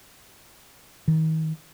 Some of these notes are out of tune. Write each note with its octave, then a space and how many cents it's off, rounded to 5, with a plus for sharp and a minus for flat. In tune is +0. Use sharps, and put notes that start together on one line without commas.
D#3 +35